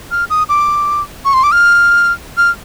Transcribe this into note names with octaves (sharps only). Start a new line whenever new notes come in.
F6
D#6
D6
C#6
C6
D6
F6
F6